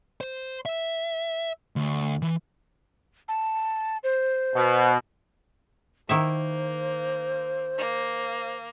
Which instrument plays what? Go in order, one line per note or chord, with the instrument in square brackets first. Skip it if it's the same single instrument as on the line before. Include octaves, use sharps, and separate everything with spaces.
[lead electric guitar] C5
E5
D2
E3
[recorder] A5
C5
[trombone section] B2
[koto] D#3 E4 E5 [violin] A#3 [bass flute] C5
[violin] A#3